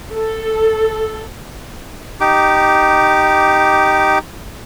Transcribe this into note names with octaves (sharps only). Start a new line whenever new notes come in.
A4
D#4 G4 D6